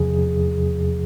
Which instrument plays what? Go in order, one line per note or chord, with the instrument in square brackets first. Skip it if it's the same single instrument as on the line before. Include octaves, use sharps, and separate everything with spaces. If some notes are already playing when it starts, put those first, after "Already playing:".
Already playing: [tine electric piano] E2 C3 F3 G#4